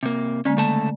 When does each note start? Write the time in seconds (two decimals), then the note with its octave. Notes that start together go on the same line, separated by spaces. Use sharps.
0.03 C3 A#3
0.45 D3 G#3 A#3 C#4
0.57 C#3 A3 A5